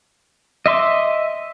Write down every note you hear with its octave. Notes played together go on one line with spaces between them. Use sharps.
D#5 E5 C6 D6